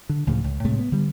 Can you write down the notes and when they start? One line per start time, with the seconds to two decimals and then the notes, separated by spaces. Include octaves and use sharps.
0.09 D3
0.27 C#2 A2 C#3 F3
0.44 C#2
0.65 A2 C3 G#3 A3
0.79 B3
0.92 D3 G3